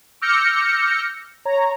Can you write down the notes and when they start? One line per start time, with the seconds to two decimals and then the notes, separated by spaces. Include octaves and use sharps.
0.21 D6 E6 F6 G6 A#6 C#7
1.45 C#5 A#5